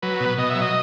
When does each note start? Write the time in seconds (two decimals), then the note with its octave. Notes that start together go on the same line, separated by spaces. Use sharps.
0.02 F#3 B4
0.20 B2
0.38 B2 D#5
0.50 E5
0.55 F#3
0.61 D#5